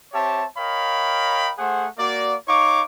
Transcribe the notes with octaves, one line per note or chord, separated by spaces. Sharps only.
C4 G4 C#5 E5 A5
A#4 C#5 D#5 F5 G5 B5
A3 G#4 C5 F#5
A#3 F#4 D5
D#4 C#5 F5 C#6 D6